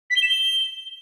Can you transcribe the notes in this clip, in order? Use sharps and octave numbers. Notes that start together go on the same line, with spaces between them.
B6
G7
E7
G7